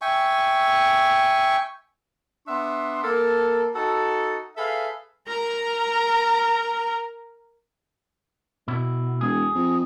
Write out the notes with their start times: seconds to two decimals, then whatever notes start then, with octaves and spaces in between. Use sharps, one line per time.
0.01 E5 G5 G#5 C#6
2.48 B3 D4 E5 C6
3.04 A#3 A4
3.75 D#4 F#4 A4
4.57 G#4 A4 B4 E5 F5
5.28 A#4 A#5
8.68 B2 E4
9.21 E1 G#4
9.55 F2